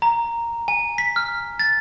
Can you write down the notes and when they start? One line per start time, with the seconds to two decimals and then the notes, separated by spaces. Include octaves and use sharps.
0.02 A#5
0.68 G#5
0.98 B6
1.16 F6
1.59 A6